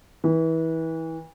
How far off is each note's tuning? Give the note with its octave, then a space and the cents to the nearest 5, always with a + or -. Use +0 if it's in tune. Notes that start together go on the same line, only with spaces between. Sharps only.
E3 -25